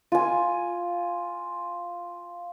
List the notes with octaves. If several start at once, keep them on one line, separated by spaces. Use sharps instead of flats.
F4 G#5